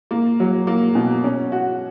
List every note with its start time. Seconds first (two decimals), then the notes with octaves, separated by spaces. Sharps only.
0.11 A#3
0.40 F#3
0.67 A#3
0.95 B2
1.24 C#4
1.52 F#4